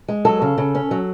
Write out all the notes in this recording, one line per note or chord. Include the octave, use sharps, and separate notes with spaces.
G#3
F#3 A4
C#3
C#3
C#4
F#3